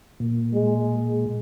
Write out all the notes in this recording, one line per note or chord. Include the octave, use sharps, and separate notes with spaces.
A#2
G#3